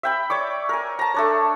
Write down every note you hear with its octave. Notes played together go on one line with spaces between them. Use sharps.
E5 G5 B5
C#5 D5 D6
A#4 G#5
A5 A#5
A3 D4 C#5